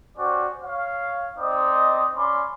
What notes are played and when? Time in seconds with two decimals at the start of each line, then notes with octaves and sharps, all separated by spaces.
0.18 C#4 F#4 G4 C5 D5
0.64 C#5 F5
1.38 C4 D#4 D5 D#5 D#6
2.17 C#4 D5 B5 C6 D6